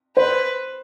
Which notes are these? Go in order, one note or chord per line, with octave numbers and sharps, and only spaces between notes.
B4 C5